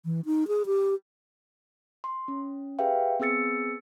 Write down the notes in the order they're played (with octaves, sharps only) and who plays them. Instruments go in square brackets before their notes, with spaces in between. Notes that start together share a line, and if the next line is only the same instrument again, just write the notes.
[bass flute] E3
D#4
G#4
G4
[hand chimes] C6
C#4
G4 G#4 B4 E5 F5 G5
B3 C4 G#4 E6 A6 C#7